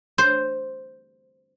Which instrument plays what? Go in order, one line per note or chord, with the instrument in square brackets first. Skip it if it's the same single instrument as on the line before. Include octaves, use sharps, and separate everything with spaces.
[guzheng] C5